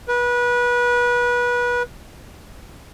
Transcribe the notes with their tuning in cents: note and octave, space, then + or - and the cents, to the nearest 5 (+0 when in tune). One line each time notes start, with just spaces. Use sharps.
B4 -25